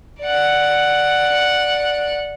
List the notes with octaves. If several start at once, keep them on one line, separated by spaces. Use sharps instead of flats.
D5 F#5